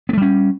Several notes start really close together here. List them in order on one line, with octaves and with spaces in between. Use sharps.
B3 A3 G3 C#4